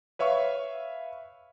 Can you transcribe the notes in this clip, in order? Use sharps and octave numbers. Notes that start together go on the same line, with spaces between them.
B4 C#5 E5 F5 C#6